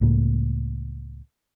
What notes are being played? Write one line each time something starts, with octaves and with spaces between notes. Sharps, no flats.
C#2 A2 A#3